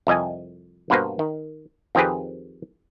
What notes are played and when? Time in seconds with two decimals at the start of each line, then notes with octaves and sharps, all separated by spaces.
0.07 C2 F2 D#5 G#5
0.90 G2 B2 A#3 F#4 B4 C5
1.19 D#3
1.95 F2 D#3 C4 G4 G#4 B4